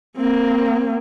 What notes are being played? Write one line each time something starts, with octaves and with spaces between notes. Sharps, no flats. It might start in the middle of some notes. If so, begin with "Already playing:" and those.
A#3 C4